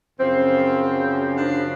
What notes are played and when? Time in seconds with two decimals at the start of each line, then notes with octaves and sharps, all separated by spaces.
0.19 F#2 C#3 F3 C4
1.36 D4